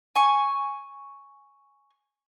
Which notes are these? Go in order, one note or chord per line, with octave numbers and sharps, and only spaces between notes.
G#5 C#6